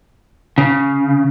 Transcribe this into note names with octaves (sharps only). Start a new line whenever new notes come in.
C#3